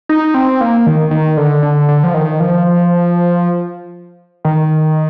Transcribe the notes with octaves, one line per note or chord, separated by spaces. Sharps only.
D#4
C4
A#3
D#3
D#3
D3
D3
D3
F3
D#3
F3
D#3